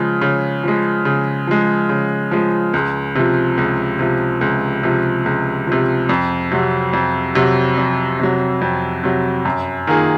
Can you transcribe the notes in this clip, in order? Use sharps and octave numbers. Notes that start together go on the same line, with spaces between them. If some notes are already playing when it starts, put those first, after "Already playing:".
Already playing: C#3 F3 G#3
C#3
F3 G#3
C#3
F3 G#3
C#3
F3 G#3
C#2
C3 F3
C#2
C3 F3
C#2
C3 F3
C#2
C3 F3
F2
C3 F#3
F2
C3 F#3
F2
C3 F#3
F2
C3 F#3
F#2
D#3 A#3 F4 G#4